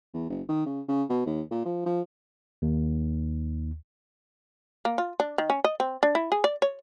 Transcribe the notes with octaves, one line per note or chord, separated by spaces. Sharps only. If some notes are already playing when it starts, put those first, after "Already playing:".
E2
F#1
D#3
C#3
C#3
B2
D#2
A#2
F3
F3
D#2
A#3
F4
D4
D#3
C#4
D#5
C4
D4
E4
G#4
D5
C#5